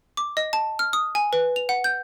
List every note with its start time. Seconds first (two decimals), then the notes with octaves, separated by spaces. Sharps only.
0.17 D6
0.37 D#5
0.53 A5
0.79 F6
0.93 D#6
1.15 G#5
1.33 B4
1.56 F7
1.69 F#5
1.84 G6